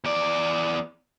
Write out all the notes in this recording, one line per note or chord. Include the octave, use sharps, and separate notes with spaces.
E2 D5